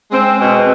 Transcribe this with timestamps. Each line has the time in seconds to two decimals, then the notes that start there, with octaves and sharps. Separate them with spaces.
0.11 G#3 C4
0.39 B2 C4